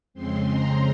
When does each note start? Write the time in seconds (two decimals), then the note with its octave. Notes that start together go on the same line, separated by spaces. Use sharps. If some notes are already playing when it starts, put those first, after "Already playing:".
0.14 F2 C#3 G#3 C4 C6
0.49 A#5